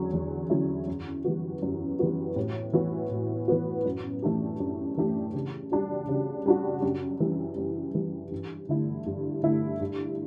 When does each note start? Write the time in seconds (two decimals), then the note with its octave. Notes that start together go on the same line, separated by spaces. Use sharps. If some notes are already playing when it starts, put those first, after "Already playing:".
Already playing: E2 D3 F#3 C#4
0.13 E2
0.50 D3 F#3 C#4 E4
0.87 F#2
1.25 E3 G3 B3 F#4
1.63 F#2
1.99 E3 G3 B3 F#4
2.36 A2
2.73 E3 B3 F#4
3.11 A2
3.48 E3 B3 F#4
3.85 F#2
4.22 E3 A3 D4 G4
4.60 F#2
4.97 E3 A3 D4 G4
5.34 C#3
5.72 G3 D4 F#4
6.08 C#3
6.46 G3 D4 F#4
6.82 F#2
7.20 E3 G3
7.58 F#2
7.94 E3 G3
8.31 G2
8.69 D3 A3 E4
9.06 G2
9.43 D3 A3 E4
9.81 G2